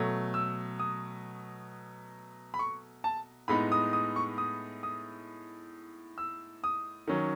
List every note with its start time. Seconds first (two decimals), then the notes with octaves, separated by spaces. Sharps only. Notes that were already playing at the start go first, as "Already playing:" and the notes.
Already playing: B2 F#3 A3
0.34 E6
0.79 D#6
2.54 B5
2.59 C#6
3.04 A5
3.48 A2 G#3 B3 D#4 B5
3.72 D#6
3.93 D#6
4.16 C#6
4.38 D#6
4.83 D#6
6.18 E6
6.64 D#6
7.08 D#3 F#3 C#4